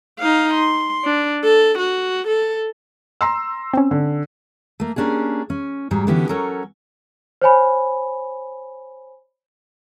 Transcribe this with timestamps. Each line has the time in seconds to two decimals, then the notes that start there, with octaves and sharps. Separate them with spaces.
0.19 D#4 F5
0.54 C6
1.05 D4
1.44 A4
1.78 F#4
2.27 A4
3.21 A#5 C6 E6
3.74 C4 C#4
3.91 D3
4.80 A3 A#3
4.96 A#3 C#4 D4 G4 G#4
5.50 C#4
5.91 G#2 F#3 G3
6.07 D3 E3 B3 C#4 F#4 G4
6.29 F#3 C#4 A4 A#4 C#5
7.42 C5 C#5 G#5 B5